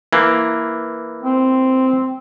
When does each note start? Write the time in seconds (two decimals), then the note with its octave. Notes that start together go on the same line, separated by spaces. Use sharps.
0.13 E3 A#3
1.23 C4